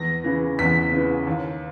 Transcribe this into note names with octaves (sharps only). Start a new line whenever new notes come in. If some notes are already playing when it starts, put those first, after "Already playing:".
Already playing: E2 A#6
C#3 E3
E2 B6
C#3 E3
D#2